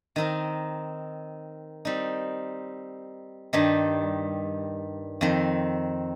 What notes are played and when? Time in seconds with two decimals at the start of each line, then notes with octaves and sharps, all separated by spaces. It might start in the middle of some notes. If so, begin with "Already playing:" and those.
0.16 D#3 C4 D#4 A#4
1.85 G3 C4 D#4
3.53 G2 D#3 G3 D#4
5.21 F2 D#3 C4